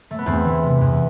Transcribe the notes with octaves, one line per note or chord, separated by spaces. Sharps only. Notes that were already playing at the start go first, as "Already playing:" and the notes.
A3
B3
E2 A3 C4
E3
C3
E2